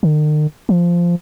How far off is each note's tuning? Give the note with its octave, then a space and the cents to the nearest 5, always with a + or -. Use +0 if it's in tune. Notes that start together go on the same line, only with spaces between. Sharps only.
D#3 -45
F3 -10